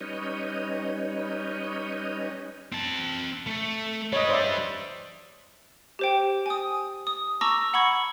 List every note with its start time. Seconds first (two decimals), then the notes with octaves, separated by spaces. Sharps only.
0.01 G3 C#4 D#4 B4 C#5 D#5
2.72 C4 A5
3.46 A3
4.13 G3 B4 C#5 D#5
4.29 C5 D5 E5
5.99 G4 C5 G5
6.46 G#5 D#6
7.07 D#6
7.41 A5 A#5 C#6 D6 E6 A#6
7.74 F#5 B5 C#6 G#6